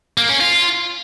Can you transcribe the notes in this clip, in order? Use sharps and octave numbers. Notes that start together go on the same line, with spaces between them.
A#3
C#4
F4